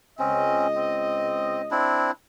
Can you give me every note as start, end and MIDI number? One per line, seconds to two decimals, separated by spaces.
0.19 1.89 37
0.19 0.67 60
0.19 0.67 61
0.19 1.89 75
0.76 1.62 60
1.71 2.11 60
1.71 2.11 62
1.71 2.11 64